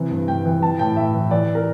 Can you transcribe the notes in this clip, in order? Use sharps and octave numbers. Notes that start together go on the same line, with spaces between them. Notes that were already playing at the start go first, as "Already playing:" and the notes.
Already playing: C3 E3
G2
G2 G5
E3
E3 A5
A2 G5
A2 E5
E3
E3 D5
A#4